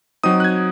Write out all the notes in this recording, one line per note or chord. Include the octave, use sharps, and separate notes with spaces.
F#3 C4 D#4 D#6
F#6
G#6